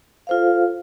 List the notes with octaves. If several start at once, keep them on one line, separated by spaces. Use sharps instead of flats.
F4 A4 C5 F5